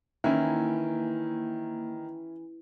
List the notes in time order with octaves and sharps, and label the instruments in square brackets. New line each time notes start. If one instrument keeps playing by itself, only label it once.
[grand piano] D#3 [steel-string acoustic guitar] E3 [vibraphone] A#3 [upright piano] C#4 E4